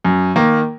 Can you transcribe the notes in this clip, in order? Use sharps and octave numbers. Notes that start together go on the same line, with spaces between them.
F#2
D#3 A#3